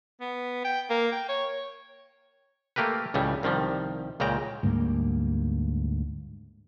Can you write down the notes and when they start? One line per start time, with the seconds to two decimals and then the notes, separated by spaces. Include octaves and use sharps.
0.21 B3
0.64 G5
0.90 A#3
1.12 G5
1.28 C#5
2.76 A3 A#3 G4 A#4 B4
3.14 C#2 A2 C#3 G3
3.43 C2 D#3 F3 G3
4.20 C#2 A#2 C#3 G5 A#5
4.63 D2 G#2 G3 A#3